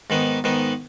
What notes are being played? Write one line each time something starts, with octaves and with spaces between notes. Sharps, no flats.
G#2 D#3 B3
G#2 D#3 B3